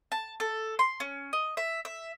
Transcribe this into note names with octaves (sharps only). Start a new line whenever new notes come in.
A5
A4
C6
C#4
D#5
E5
E5